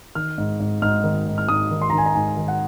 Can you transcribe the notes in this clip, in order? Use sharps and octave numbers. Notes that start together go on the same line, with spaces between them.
D#3 F6
G#2
G#2
G#2 F6
D#3
G#2
F6
G#2 D#6
D#3
C6
D#3 A#5
G#5
A#5
G#2 G#5
D#3
F#5